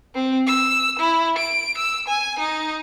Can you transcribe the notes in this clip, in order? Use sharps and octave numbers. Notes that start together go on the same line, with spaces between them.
C4
E6
E4
D7
E6
G#5
D#4